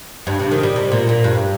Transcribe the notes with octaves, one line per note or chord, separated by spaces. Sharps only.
G2
C3
D#3
G3
C3
A#2
A#2
G2